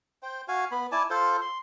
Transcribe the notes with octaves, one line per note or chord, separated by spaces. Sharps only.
C5 G5
F#4 F5 G#5
B3 B5
E4 D5 G#5 A5
F4 A4 C5
C6